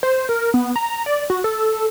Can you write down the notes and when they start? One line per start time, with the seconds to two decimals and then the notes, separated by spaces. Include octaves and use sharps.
0.03 C5
0.29 A#4
0.54 B3
0.76 A#5
1.06 D5
1.30 F#4
1.44 A4